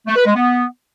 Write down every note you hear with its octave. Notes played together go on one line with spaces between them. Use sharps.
A3
B4
G#3
B3